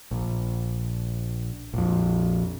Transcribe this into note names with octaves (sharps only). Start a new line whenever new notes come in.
A#1
A#1 F2